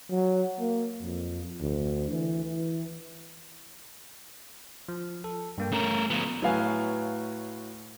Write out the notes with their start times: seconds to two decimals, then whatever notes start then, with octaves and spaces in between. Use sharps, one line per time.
0.11 F#3
0.60 A#3
1.02 F2
1.61 D2
2.10 E3
2.45 E3
4.88 F3
5.24 A4
5.58 G2 A#3 G5
5.72 A3 C#4 A#4
6.10 F3 B3 F4
6.42 A2 F#3 B4 F5 G#5